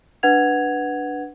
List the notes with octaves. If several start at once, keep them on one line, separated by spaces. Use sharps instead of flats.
D4 B4 F#5 G#6 F7